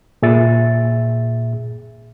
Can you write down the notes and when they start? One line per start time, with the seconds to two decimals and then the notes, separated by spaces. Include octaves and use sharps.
0.22 A#2 G#4 E5 A6